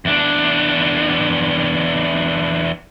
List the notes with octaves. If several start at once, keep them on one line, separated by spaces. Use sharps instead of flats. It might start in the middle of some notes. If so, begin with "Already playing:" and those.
E2 D4